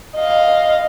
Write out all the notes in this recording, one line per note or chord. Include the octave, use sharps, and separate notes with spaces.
D#5 F5